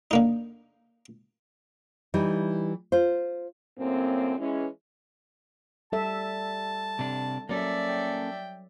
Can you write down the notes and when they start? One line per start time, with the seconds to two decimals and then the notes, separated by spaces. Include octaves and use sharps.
0.11 D3 A#3 D#4
2.14 E3 G3 D#4
2.92 F4 C5
3.78 F#2 A2 A#3 C4
4.39 E3 G#3 C#4
5.92 G3 A4 E5 A5
6.99 C3 D4
7.49 F#3 A#3 C#4 A4 D5 E5
7.88 G5